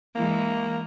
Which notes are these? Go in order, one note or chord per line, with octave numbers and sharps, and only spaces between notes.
E3 G#3 A#3